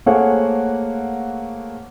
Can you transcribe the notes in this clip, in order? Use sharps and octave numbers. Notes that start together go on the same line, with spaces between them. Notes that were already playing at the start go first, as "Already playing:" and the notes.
A3 A#3 G#4 C5 C#5 F#5